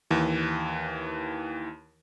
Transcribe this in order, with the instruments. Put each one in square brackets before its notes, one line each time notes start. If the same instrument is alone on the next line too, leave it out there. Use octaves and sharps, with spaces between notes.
[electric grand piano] D#2 E3